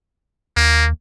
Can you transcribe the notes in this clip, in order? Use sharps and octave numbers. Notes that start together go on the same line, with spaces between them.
D#2 A#3